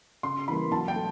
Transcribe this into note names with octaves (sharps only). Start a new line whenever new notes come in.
C#3 C6
E3 G3 A#3 B5
F#3 A5
G5
A3